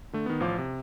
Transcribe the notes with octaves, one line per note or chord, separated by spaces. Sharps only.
D3 A3
D#3 B3
A1 F3 C5 F5 D6
C3